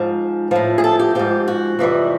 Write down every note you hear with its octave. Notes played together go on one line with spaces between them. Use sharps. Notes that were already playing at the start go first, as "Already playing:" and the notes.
Already playing: G#2 F3
A2 F3
G#4
A4
G4
G#2 F3 G4
F#4
F2 C3 E3 G3